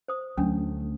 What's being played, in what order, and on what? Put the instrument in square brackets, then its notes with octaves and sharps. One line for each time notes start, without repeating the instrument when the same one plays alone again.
[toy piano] C5 D#6
[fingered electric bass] D2 A3 [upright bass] F#3 [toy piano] C#4 D4